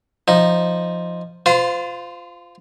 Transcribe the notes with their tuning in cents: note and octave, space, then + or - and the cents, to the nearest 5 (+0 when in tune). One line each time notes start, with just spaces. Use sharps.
F3 +0 D#4 +0
F4 +0 C5 -30